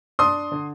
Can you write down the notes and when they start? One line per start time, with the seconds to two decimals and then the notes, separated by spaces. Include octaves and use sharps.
0.19 D4 C6 D#6
0.52 D3